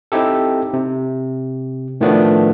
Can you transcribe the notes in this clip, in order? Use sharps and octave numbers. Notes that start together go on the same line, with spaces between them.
C4 D#4 E4 G4 A4
C3
A2 D#3 F3 A3 B3 D4